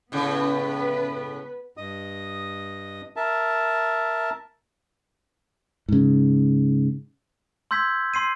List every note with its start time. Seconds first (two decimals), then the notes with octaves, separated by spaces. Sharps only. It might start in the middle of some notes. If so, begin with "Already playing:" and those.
0.12 A2 C#3 B3 B4
1.77 G2 D#5 D#6
3.16 A#4 E5 A5
5.89 G#2 C#3
7.71 C6 E6 G6 G#6 B6
8.14 C6 C7 D#7